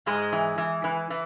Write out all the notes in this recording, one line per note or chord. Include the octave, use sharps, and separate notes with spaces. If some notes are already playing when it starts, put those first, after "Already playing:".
G#2 G#3
E3
E3
E3
E3